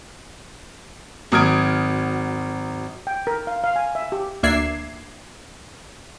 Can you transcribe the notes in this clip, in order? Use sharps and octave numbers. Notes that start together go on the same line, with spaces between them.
G#1 F#3 D#6 F6 G#6 D7
G5
A#4
F5
F5
G#5
E5
G4
D2 A#3 D4 E5 G#6 C7